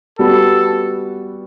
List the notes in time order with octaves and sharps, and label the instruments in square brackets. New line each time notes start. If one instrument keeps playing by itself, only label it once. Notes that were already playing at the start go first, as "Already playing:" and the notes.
[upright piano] G3 B3 F#4 [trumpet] A4